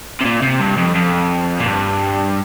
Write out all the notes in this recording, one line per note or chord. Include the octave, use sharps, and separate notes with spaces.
C3
A#2
C3
G2
F2
F2
A#2
G2